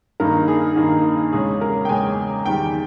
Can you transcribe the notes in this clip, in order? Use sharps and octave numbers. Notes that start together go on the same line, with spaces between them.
G2 D#3 A#3 D#4 A#4
G#4
G2 D#3 A#3 D#4
E2 C#3 G#3 C#4 G#4
A#4
G5
E2 C#3 G#3 C#4 G#5
E2 D#3 G3 G5